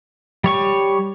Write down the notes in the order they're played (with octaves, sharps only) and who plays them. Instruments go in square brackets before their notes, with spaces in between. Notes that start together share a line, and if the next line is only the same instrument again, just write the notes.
[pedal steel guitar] G3 C#5 C#6